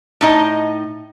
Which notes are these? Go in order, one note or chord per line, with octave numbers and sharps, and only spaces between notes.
A2 D#4 D#5